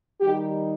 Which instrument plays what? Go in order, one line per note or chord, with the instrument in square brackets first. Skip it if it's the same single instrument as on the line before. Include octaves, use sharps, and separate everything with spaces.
[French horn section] D#3 G3 D#4 G4